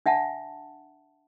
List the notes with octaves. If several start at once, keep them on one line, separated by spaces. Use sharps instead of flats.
D4 E5 F#5 A5